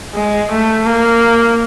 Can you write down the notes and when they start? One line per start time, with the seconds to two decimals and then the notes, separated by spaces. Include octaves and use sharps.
0.14 G#3
0.51 A3
0.86 A#3